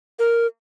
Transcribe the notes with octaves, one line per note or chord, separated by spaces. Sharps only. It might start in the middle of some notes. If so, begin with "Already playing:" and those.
A#4